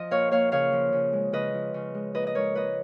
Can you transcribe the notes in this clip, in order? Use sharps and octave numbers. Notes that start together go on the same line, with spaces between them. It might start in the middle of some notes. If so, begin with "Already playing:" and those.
Already playing: F3 D#5
A#2 C#5 F5
A#3 C#5 F5
C#3 C#5 F5
F3
C#3
G#3
C#3 B4 D#5
F3
C#3
G#3
A#2 B4 D#5
D#5
G#3 A#4 C#5
A#2 B4 D#5